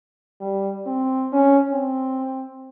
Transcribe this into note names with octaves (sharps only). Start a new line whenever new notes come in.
G3
C4
C#4
C4